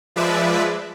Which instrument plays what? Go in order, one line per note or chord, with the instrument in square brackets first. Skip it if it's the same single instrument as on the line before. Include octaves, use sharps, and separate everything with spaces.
[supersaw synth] F3 G#3 B4 D5 E5